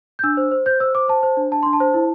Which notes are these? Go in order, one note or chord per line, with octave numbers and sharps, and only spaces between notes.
G6
D4 E6
C5
C5
C5 G6
C5 E6
C5 D6
C5 A5
C5
D4
D4 A5
D4 C6
A5
C5
E4